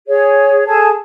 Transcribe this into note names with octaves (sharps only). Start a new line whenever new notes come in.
G#4 C#5
G#4 A4 A5